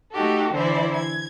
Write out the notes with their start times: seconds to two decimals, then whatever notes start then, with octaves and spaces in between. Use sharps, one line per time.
0.12 A3 D#4 F#4 G4 A4
0.52 D3 E3 E4 C5 D5
0.96 G#6